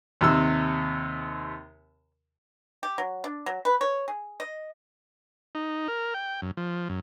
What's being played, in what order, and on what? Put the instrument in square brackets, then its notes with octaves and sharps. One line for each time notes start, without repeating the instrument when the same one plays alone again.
[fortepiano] D#2 C3 E6
[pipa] G4
F#3
D4
F#3
B4
C#5
G#4
D#5
[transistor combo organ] D#4
A#4
G5
F#2
F3
F#2